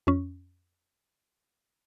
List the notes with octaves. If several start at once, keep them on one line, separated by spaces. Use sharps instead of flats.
F2 C#4